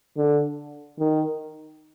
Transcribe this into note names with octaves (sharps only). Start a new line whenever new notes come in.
D3
D#3